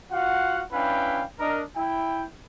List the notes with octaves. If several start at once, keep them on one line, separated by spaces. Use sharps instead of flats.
F4 F#4 F5 F#5
C#4 D4 E4 B4 F5 G5
D4 A#4 D#5
E4 G5